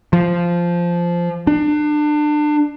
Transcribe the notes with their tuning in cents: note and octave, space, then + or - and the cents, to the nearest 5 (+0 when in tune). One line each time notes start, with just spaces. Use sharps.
F3 -10
D4 +30